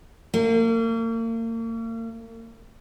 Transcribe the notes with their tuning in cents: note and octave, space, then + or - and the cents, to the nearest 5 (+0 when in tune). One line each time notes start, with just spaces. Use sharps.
A#3 -40